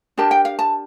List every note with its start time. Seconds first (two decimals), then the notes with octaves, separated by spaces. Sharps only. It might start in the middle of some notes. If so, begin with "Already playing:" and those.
0.18 D4 G4 A#4 A5
0.31 G5
0.45 F5
0.59 A5